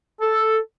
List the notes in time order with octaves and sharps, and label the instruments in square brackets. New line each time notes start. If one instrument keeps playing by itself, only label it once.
[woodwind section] A4